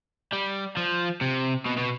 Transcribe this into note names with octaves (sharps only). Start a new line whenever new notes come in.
G3
F3
C3
B2
B2